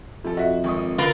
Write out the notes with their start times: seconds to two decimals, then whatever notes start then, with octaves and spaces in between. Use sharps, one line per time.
0.24 F2 C3 A4
0.37 F#4 D#5 E5
0.64 G#1 C#6 D#6
0.98 D3 F4 A#4 B4